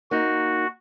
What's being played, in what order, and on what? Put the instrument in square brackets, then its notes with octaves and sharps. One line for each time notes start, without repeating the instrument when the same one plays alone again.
[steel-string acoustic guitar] A#3 D#4 [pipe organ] F#4